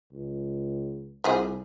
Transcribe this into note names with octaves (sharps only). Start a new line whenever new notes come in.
C#2
C2 F3 G3 G#4